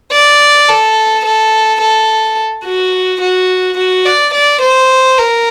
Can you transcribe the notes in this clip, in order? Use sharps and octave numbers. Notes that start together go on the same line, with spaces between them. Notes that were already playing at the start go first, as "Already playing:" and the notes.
D5
A4
A4
A4
F#4
F#4
F#4
D5
D5
C5
A#4